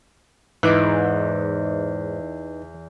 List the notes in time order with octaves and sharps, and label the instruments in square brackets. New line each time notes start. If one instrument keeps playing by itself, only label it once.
[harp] E2 D6 F#6 [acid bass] G#2 [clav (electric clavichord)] E3 [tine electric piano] D#4 B4 D#5